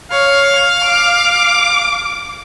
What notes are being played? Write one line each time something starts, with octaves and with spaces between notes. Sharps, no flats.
C#5 F5
D6